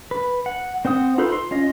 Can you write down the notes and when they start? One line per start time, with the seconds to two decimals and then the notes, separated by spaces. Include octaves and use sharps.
0.11 B4
0.46 F#5
0.85 C4 C5 F#5 D#6
1.18 D#4 F4 A4 B4 C5
1.32 C6
1.51 C#4 F4 D#5